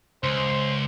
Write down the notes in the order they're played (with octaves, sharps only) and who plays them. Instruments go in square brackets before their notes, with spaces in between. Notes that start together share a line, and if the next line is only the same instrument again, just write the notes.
[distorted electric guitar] C#2 [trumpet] C5